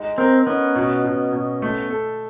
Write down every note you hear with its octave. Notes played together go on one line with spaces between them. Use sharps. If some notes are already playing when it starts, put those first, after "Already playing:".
Already playing: G#3 D#4
C4 A#4
B3 C#4 D#4
B2
B2
B2
A3
A4